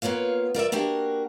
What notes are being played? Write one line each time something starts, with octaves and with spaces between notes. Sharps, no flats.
A#3 B3 F4 C#5 F5
F4 A#4 D5 E5
A#3 D4 F#4 G4 A#4